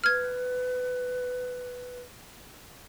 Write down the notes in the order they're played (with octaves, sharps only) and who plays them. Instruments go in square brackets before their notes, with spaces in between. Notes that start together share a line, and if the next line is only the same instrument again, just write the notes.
[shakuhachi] B4 [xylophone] F6 G#6